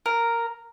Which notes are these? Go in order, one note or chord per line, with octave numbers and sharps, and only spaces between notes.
A#4